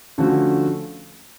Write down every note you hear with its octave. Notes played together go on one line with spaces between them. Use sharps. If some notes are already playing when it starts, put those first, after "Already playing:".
D3 F3 A3 C#4 F#4